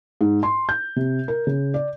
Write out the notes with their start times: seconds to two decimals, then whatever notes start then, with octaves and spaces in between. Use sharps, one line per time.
0.21 G#2
0.43 C6
0.69 G6
0.96 C3
1.28 A#4
1.47 C#3
1.74 D5